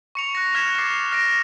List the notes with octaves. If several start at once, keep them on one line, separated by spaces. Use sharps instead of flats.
C#6 C#7 F7
F#6 A#6
F6 G#6 B6 E7
D6 A6 C7
F6 A#6 D7